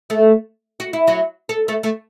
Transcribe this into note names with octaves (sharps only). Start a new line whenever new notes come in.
A3 A4
F#4
E4
F#3 F#4
A4
A3 A4
A3 A4